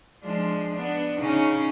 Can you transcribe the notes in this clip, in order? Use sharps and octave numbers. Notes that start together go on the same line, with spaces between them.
F3 G#3 D4
B3 D4
C#3 C#4 D#4